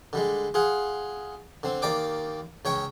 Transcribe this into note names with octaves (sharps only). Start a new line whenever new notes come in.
D3 G3 G#3
F4 G#4 F#5
D3 C4
D#2 A#3 D5 G5 D6
C#2 C#5 G5 C#6